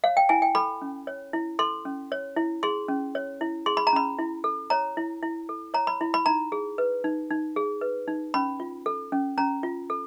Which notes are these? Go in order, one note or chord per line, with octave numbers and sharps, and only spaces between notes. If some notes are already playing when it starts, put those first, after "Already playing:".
C#5 F5
G5
E4 G#5
G5
A4 B5
C#4
C#5
E4
A4 C6
C#4
C#5
E4
G#4 C6
C#4
C#5
E4
G#4 C6
B5
A#5
C#4 B5
E4
A4
C#5 A#5
E4
E4
A4
C#5 A#5
B5
E4
B5
D#4 A#5
G#4
B4
D#4
D#4
G#4
B4
D#4
C#4 B5
F4
A4
C#4
C#4 A#5
F4
A4